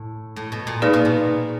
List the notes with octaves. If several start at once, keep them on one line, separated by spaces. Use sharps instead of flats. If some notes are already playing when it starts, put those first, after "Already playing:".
Already playing: A2
A2
B2
A#2
B2 A#3 D#4 G#4 B4 D5
B2
A#2